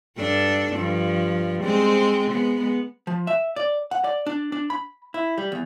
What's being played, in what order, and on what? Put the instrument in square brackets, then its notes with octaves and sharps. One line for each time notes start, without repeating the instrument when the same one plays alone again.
[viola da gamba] G2 D4 A4
G2 F3
G#3 C4 C5
G#3 B3
[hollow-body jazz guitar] F3
E5
D5
F#5
D5
D4
D4
B5
E4
G3
E2